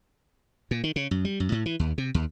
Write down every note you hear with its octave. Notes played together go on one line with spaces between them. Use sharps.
A#2
D#3
C#3
F#2
G3
F#2
A2
E3
D#2
C3
D#2